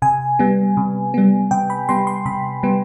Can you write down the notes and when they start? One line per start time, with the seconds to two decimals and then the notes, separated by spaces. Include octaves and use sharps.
0.02 C3 G#5
0.39 G3 B3
0.77 C3
1.14 G3 B3
1.51 C3 G5
1.70 B5
1.89 G3 B3 C6
2.07 C6
2.26 C3 B5
2.63 G3 B3